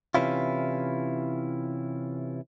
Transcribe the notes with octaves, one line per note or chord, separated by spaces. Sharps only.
C3 E3 C#4 E4 F4